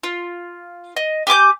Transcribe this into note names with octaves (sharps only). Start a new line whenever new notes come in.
F4
D#5
G4 G#5 D6 G6